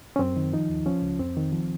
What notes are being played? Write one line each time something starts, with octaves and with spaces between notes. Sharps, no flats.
C#4
F#2 C4
D#3
F3 D#4
D#2
F3 C#4
C#2
F2 C4
D#3
F3